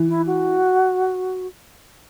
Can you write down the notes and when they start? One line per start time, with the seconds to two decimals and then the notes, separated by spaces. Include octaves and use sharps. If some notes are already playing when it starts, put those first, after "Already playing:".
Already playing: E3
0.08 E4
0.27 F#4